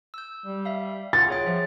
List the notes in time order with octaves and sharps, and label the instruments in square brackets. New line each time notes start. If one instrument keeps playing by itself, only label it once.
[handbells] E6 G6
[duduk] G3
[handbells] E5 F5
[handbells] F4 F#5 [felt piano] A6
[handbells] G#4 C#5 G5
[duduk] F3 [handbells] E5